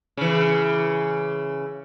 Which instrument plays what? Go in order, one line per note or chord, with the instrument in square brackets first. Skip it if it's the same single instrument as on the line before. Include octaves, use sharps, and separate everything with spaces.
[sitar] C#3 E3